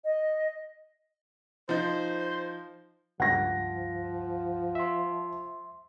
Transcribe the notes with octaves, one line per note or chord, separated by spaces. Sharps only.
D#5
F3 D#4 C5
C#2 G2 F3 F#5 A#6
E5 C6